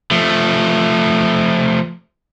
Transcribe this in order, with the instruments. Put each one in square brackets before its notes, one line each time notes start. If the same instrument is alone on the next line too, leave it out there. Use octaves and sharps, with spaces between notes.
[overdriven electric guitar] F3 A3